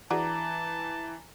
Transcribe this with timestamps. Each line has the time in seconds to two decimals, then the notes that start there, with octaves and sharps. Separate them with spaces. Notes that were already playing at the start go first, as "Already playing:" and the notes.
0.10 E3 D4 F#4 G#4 A5 A#5 D6